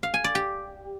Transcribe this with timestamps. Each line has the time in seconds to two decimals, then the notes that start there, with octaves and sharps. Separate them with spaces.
0.03 F5
0.14 G#5
0.24 D5
0.35 G4